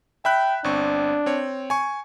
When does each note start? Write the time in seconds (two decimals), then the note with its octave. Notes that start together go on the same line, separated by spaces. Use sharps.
0.25 E5 G5 B5 F#6
0.64 G1 C4 D4 C#6
1.26 C4 C#5
1.70 G#5 C#6